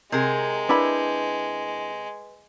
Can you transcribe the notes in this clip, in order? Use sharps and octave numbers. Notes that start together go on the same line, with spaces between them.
C3 G#3 G#4 A#4
D4 E4 B4 B5